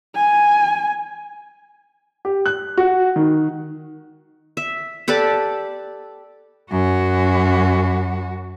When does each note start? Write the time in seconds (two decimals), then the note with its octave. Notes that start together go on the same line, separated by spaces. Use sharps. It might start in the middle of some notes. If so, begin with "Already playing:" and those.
0.16 G#5
2.25 G4
2.46 F#6
2.78 F#4
3.16 D#3
4.57 E5
5.08 G4 A4 B4 D5
6.71 F#2 F#4